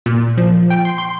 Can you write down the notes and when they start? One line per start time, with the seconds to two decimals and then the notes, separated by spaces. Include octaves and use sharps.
0.06 A#2
0.38 F3
0.70 G5
0.85 C6
0.98 C6